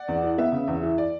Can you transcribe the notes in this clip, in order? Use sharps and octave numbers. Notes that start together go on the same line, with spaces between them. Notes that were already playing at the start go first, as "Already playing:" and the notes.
Already playing: D5 F#5
E2
E3
B3 E5
C#3
E2
E3
D5